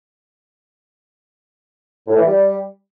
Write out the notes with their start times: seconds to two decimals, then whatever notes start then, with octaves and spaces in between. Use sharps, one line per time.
2.08 A2
2.16 E3
2.25 G3